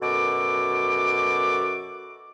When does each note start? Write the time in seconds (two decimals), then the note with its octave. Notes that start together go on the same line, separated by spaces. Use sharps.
0.02 F#2 B2 F#4 A4 D6